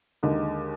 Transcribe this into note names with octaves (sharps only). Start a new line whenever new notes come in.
D#2 D3 G#3 D#4